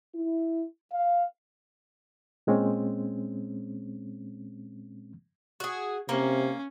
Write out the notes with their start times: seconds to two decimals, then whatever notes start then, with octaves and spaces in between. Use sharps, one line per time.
0.14 E4
0.92 F5
2.47 A#2 G#3 C4 C#4
5.60 F#4 G#4
6.09 C3 A#3 C#4